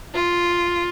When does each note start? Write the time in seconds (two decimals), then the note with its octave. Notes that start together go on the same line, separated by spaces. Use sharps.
0.14 F4